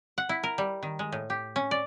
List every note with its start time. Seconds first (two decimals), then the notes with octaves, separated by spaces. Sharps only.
0.18 F#5
0.29 E4
0.43 A#4
0.58 G3
0.83 D#3
0.99 G#3
1.12 A2
1.30 G4
1.56 C#4
1.71 D5